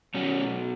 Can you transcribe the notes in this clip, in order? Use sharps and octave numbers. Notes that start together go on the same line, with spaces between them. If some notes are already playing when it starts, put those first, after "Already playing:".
B2 F#3 C#4